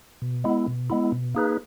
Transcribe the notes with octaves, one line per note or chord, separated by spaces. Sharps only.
B2
G#3 B3 E4
B2
G#3 B3 E4
B2
A#3 D#4 G#4 B4